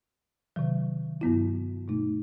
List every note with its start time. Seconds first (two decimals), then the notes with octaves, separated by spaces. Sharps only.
0.56 C3 D#3 F#3
1.21 G2 F#3 B3 E4
1.88 B2 A3 D#4